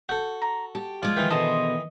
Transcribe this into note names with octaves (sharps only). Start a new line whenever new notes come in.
F#4 A4 G6
A#5
G4 A5
F3 G#3 F4 D5 D6
D#3 E3 D#4 G5
B2 D3 G#4 C5 D#5 A5